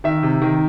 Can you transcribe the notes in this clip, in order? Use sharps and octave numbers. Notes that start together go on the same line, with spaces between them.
D#3 E5
C3
D#3